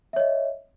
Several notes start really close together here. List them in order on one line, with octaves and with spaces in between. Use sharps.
E5 C#5 D#5